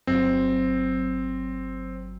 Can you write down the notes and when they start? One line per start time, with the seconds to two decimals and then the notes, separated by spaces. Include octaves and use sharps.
0.07 G1 F#3 C4